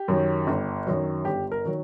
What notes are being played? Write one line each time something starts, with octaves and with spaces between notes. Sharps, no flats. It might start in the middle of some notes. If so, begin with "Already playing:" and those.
Already playing: G4
F#2 D#3 F#3
G1
F#2 D#3 F#3
G1 G4
A#4
D#3 F#3